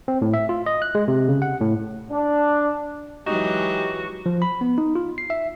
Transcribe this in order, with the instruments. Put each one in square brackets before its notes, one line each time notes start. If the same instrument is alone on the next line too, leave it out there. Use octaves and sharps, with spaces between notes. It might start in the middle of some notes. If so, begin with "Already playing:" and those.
[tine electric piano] C4
A2
E5
F4
D#5
F#6
G#3
C3
C#3
F#5
A2
[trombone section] D4
[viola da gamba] E3 F#3 G#3 [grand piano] D#4 [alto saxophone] F#4 [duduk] G4
[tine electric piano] F3
B5
B3
D#4
F4
C7
E5